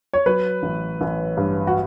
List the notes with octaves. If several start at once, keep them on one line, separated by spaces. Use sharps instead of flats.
C#5
F#3 B4
A1
A1
G2
F#4